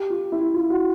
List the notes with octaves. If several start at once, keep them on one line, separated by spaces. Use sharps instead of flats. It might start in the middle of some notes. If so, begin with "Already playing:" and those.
Already playing: G4
F4
E4
F4
F#4